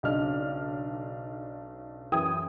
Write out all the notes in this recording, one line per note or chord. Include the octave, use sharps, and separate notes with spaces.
B1 C#3 D4 D#4 F6
F#2 E3 G5 D#6 G#6